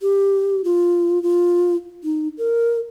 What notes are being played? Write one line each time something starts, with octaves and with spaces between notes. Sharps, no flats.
G4
F4
F4
D#4
A#4